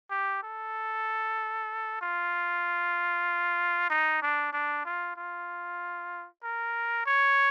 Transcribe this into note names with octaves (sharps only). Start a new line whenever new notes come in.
G4
A4
F4
D#4
D4
D4
F4
F4
A#4
C#5